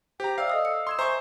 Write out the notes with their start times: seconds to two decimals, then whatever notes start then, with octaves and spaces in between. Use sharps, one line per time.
0.20 G4 C5 G5 A#5
0.38 C5 D5 E5 F5 E6
0.50 A4 D#5 D#6
0.65 C#7
0.87 C6 D#6 G#6 E7
0.99 C5 E5 G#5 A#5 C#6